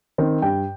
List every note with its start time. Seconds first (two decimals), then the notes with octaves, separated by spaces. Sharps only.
0.18 D#3 C4
0.42 G2 G5